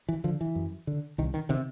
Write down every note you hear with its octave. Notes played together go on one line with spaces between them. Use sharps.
E3
D3 F3
E3
F#2
D3
C2 D#3
D#3
C3 D#3